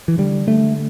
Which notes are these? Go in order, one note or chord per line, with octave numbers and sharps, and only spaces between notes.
E3
D3 G3
D3 A3